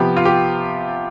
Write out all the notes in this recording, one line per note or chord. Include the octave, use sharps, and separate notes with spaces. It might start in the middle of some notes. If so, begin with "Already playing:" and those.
Already playing: C3 F3 B3 G4
F4
G4